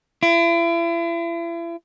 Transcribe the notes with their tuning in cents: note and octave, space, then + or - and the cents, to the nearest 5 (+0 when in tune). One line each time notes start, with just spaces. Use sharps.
E4 +40